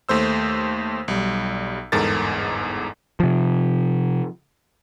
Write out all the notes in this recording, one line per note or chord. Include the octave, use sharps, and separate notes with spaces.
D#2 A3 C5 E6
B1 G3
G1 E2 G#2 A4 A#4 A6
C3 F3